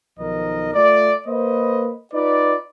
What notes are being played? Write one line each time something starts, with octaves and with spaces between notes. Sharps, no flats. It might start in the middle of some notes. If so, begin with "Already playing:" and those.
B1 D#3 F3 A#4 D#5
A3 F4 D5
A#3 B4 C5 D#5
D#4 F4 B4 D5